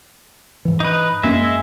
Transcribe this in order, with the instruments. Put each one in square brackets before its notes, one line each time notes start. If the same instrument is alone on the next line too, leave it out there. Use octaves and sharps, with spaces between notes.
[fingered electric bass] G#2 E3
[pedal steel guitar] D#4 B4
[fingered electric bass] F#2 A#3 C#4 [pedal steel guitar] G#3 E5